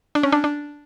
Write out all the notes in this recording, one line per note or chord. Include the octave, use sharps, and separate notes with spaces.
D4
C#4
D4
D4